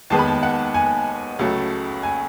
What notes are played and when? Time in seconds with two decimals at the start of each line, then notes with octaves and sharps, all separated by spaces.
0.10 D#2 D#3 G#3 B3 A5
0.19 B5
0.27 A5
0.43 F#5
0.74 G#5
1.39 C#2 C#3 F#3 A3
2.03 G#5